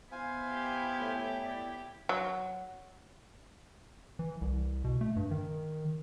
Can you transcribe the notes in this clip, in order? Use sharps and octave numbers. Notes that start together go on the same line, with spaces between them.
B3 E4 C5 F5 G#5
G4
A2
D5
F#3
E3
C2
B2
A3
G2
D#3